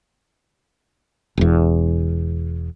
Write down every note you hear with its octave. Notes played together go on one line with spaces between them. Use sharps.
E1 E2